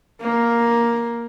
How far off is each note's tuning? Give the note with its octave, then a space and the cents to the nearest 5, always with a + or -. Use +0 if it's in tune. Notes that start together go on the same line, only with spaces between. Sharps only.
A#3 +5